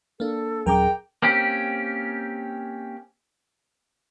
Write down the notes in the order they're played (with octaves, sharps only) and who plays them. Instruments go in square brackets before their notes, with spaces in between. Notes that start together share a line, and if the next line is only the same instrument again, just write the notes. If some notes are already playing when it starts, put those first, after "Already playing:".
[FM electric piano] A#3 D4 [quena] A4
[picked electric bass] D#1 F#3 C#4 [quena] G#4 [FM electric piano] A#4 A#5 D6 [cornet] G5
[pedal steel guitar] A#3 C4 C#4 G4